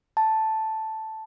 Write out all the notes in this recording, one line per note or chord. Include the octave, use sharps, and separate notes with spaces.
A5